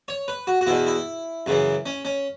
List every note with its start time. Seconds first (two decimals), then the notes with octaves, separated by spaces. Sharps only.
0.08 C#5
0.28 B4
0.47 F#4
0.61 F#4
0.67 E2 B2 E4
0.87 E4
1.46 F#2 C#3 E3
1.86 C#4
2.05 C#4